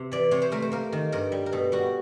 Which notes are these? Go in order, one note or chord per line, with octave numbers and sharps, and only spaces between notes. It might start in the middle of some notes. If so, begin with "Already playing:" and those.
Already playing: C3
E3 D5
C3 C#5
C5
A3 A#4
C5
A#3 A#4
D#3
G2 A#4
G3
A#4
B2 A4
G3 F#4